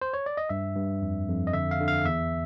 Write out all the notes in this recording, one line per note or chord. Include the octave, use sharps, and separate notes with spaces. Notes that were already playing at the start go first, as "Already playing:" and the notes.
C5
C#5
D5
D#5
G2 E5
G2
F2
F2
D#5
D3 E5
F5
D3
F5
E2 E5